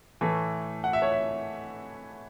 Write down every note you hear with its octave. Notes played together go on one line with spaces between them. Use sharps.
A2 E3 A3
F#5
E5
C#5
E5